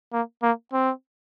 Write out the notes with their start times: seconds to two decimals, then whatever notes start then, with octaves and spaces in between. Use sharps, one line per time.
0.12 A#3
0.43 A#3
0.73 C4